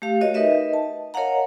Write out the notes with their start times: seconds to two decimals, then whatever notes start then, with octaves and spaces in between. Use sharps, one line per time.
0.02 A3 G4 F5
0.21 F#4 A#4 C#5 D#5
0.34 D#4 A#4 B4 D#5 E5
0.73 A5
1.14 A#4 C#5 D#5 F5 F#5 A#5